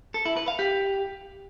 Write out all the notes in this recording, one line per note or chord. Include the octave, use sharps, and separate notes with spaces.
A4
E4
B4
F5
G4